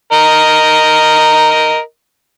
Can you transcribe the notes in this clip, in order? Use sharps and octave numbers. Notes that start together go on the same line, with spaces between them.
A#4 D#5